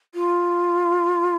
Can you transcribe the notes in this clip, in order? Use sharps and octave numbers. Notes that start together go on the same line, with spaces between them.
F4